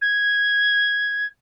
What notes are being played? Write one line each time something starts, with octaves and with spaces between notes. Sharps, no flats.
G#6